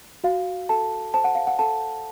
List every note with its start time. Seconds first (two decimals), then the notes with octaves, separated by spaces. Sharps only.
0.24 F#4 F5
0.69 A4 A5
1.14 C5 A5
1.24 F#5
1.35 F5
1.47 F#5
1.59 A4 A5